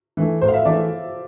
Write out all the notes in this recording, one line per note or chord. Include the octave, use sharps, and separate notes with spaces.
E3 A3
A2 C5
F5
E5
E3 A3 D5